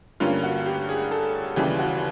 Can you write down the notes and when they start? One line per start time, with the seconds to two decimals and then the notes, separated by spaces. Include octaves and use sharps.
0.20 G2 D3 G3 A#3 C#4 F4
0.44 F#4
0.66 G4
0.89 G#4
1.11 A4
1.56 D#2 C#3 E3 G3 G4
1.79 F#4